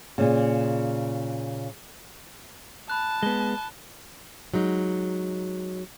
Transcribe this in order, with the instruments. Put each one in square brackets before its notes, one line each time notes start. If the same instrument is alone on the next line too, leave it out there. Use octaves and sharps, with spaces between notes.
[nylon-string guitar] A#2 C#3
[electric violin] A5 [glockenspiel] B5 F#6
[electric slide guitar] G#3 B3 [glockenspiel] G7
[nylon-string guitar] F#3 G#3 D#4